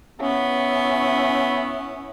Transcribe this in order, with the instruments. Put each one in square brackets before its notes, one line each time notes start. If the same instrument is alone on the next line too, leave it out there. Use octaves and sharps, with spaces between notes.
[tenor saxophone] B3 [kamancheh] C#4 E4